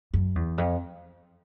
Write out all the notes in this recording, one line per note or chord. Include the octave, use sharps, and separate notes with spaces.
F#2
E2
F2